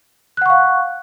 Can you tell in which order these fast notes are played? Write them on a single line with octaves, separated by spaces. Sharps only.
F#6 F#5 C#6 F5